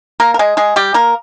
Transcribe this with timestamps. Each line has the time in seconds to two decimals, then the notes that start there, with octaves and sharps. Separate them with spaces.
0.20 A#3 A#4
0.34 A#4
0.39 G#3 G#4
0.57 G#3 G#4
0.76 G3 G4
0.94 A#3 A#4